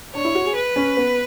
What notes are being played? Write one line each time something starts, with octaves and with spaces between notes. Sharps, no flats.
D4 C#5
E4
F#4
G#4
B4
C#4
B3